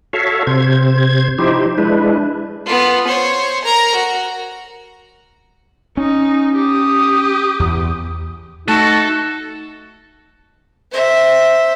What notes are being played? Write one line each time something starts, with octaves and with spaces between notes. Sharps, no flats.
F#4 A4 C#5 E5 F5
C3 C5 G#6
F3 D#4 E4 G4 C5
G#3 D4 E4 B4
B3 F4
C5 C#5
A#4 A#5
F#4
C#4 D#4
G4 D#6
E2
A3 D#4 F#4 A4 A5
C5 E5